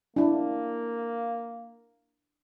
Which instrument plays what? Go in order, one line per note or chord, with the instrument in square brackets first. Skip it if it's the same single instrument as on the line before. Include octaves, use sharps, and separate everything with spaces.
[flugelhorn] A#3 [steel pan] D4 E4